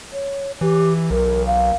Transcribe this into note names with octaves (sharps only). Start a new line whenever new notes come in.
C#5
E3 G4
B1 A#4
F5